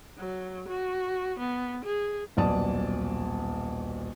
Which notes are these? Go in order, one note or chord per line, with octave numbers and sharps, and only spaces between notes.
F#3
F#4
B3
G#4
D#1 B1 D5 A5 D#6